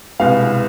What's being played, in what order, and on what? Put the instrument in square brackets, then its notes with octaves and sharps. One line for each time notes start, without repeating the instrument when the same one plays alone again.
[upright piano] C2 B2 G#3 B3 F5